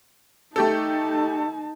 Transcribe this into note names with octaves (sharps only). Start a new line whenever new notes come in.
A3 D#4 G4 A4 A5